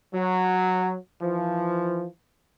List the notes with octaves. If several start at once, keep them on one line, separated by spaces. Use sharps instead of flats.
F#3
E3 F3